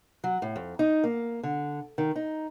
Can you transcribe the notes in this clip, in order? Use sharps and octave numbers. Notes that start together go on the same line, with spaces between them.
F#3
A2
F2
D#4
A#3
D3
D#3
D#4